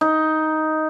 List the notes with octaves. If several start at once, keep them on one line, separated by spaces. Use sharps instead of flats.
D#4